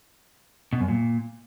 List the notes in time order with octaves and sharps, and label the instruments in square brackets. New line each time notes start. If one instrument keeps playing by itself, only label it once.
[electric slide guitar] B2
F#2
A#2